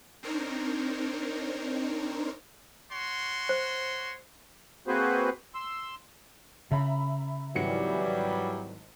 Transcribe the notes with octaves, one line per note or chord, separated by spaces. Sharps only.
C4 D4 D#4 A#4 C5 C#5
F#4 C#5 C6
C5
A#3 C4 F#4 G#4 B4 C5
C6 E6
C#3 E5 A#5 B5
G#1 E3 F#3 G3 C#7